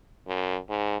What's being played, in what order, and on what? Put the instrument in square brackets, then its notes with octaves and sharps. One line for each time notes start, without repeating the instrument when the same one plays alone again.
[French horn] F#2
G#2